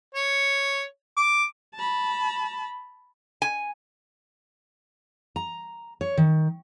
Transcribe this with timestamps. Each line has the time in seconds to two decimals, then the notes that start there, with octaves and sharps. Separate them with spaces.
0.15 C#5
1.17 D6
1.75 A5 B5
3.42 G#5
5.36 A#5
6.01 C#5
6.17 D#3